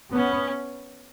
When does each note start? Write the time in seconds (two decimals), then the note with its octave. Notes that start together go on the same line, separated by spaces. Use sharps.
0.13 B3 C#4